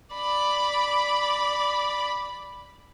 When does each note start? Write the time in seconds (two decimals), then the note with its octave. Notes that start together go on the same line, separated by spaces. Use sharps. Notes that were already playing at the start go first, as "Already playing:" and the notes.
0.14 D5 B5